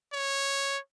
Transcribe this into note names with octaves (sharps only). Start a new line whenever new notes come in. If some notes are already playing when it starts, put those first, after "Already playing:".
C#5